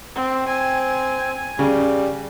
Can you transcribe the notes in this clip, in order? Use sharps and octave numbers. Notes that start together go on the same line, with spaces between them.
C4
C4 G#5
C#3 G3